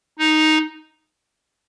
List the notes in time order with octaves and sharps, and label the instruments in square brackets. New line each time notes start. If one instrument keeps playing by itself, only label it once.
[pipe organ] D#4